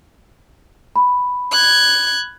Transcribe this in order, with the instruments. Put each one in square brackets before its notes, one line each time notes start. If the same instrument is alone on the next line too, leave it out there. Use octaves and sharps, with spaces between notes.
[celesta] B5
[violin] F#6 G#6